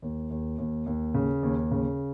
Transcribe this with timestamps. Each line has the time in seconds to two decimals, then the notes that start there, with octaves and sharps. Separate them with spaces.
0.02 D#2
0.31 D#2
0.58 D#2
0.86 D#2
1.14 C#3
1.43 D#2
1.71 C#3